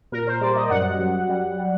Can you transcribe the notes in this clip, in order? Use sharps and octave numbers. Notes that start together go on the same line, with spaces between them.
A#2 A#4
C5
G3 D5
D#5
F#2 F#5
F#3
G3
G3